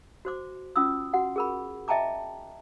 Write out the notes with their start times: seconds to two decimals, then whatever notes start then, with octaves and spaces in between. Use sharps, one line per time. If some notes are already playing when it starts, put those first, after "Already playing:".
0.25 F#4 C5 D6
0.76 C#4 F4 D#6 E6
1.13 F#4 F#5
1.36 G#4 A#4 B5
1.88 D#5 E5 G5 A5 A#5 D6